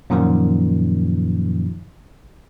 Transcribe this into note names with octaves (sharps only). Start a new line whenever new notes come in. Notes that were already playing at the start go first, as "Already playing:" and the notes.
F#2 A#2 D#3 F3